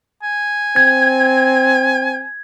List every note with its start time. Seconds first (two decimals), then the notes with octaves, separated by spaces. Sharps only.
0.23 G#5
0.76 C4 G#6